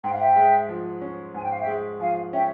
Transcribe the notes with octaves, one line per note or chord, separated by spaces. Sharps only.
G#2 G5
F5
E5 G5
G#3
F3
C#4
G#2 G#5
G5
F5
E5 G5
G#3
F3 F5 G#5
C#4 E5 G5